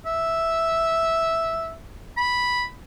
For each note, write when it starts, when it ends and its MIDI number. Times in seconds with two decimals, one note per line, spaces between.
0.06 1.74 76
2.17 2.68 83